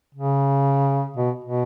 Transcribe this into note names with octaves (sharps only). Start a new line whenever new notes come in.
C#3
B2
B2